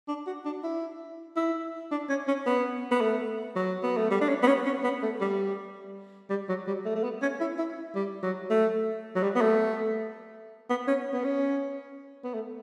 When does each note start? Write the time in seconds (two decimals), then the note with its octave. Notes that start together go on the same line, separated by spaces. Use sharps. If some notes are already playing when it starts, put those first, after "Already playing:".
0.08 D4
0.27 F#4
0.45 D4
0.64 E4
1.37 E4
1.91 D4
2.09 C#4
2.28 C#4
2.46 B3
2.91 B3
3.01 A3
3.56 F#3
3.83 B3
3.97 A3
4.11 G3
4.21 D4
4.29 C#4
4.43 B3
4.47 C#4
4.66 C#4
4.84 B3
5.02 A3
5.20 G3
6.30 G3
6.49 F#3
6.67 G3
6.85 A3
6.95 A3
7.03 B3
7.22 C#4
7.40 E4
7.58 E4
7.95 G3
8.23 F#3
8.50 A3
9.15 F#3
9.23 G3
9.35 B3
9.41 A3
10.70 B3
10.88 C#4
11.13 B3
11.24 C#4
12.24 B3
12.34 A3